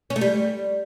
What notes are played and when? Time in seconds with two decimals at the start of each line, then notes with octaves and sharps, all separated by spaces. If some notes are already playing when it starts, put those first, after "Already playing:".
0.10 C#4
0.16 A3
0.21 G3